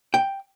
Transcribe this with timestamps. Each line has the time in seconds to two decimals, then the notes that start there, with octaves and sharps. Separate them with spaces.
0.14 G5